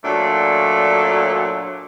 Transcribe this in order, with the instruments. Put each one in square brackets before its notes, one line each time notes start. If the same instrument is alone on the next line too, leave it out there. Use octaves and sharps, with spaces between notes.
[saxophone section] A#2 F#3 A3 D4